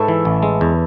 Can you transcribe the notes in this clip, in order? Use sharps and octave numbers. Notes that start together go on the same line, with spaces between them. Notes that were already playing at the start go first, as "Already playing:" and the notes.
Already playing: G#2 A4 B4 C#5 E5
E3
A1
G#3
E2